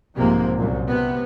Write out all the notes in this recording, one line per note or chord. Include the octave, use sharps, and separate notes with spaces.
B1 G#2 C3 F3 A#3
C2 F#2 A#2
C3 B3